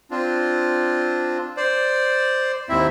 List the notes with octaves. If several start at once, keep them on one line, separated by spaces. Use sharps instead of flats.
C4 D4 F4
C5 D5
D#2 G#2 C4 E4 E5